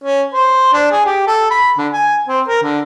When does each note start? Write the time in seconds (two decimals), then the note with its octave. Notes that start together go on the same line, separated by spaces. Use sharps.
0.04 C#4
0.34 C5
0.73 D4
0.91 G#4
1.05 G4
1.27 A4
1.51 B5
1.78 D3
1.93 G#5
2.28 C4
2.48 A#4
2.62 D3